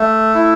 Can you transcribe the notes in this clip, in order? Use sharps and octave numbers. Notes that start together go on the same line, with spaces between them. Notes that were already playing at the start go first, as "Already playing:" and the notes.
Already playing: A3
E4